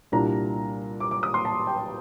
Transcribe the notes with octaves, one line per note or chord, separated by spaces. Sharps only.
C2 A#2 G3 D4 A#5
D6
D6
D#6
C6
A5
G5